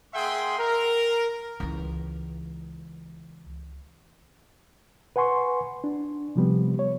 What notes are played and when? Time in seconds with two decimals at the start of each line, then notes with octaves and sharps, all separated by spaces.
0.14 A#3 G#4 E5 F#5 G5 C6
0.59 A#4
1.60 C#2 E3
5.16 B4 F#5 G#5 C6 C#6
5.84 D4
6.36 C3 F3 G3 B3
6.79 C#5